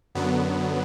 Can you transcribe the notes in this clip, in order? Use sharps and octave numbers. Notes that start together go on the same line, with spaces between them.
F#2 D3 F#3 B3